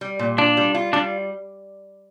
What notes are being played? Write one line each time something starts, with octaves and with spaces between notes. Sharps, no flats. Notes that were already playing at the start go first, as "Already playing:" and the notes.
G3
A#2
D4 F4
G3
F4
G3 D4